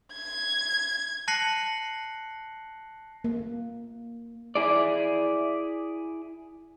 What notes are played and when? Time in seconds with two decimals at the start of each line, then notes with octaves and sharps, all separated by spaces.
0.13 G#6
1.28 A5 F#6 A#6 C7 C#7 F#7
3.24 A#3
4.55 E4 G#4 D5